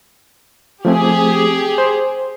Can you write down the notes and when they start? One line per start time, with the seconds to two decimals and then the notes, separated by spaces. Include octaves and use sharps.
0.85 F3 A3 C4 G4 G#4
1.78 C5